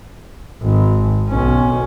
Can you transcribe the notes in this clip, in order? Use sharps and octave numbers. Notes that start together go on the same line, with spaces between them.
G#1
B1 C#4